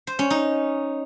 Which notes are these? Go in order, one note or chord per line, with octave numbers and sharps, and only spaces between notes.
C5
C#4
D#4